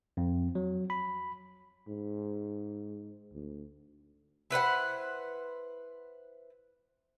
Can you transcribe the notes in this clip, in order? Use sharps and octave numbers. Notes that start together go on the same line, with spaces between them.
F2
F#3
B5
G#2
D2
E4 B4 C5 F#5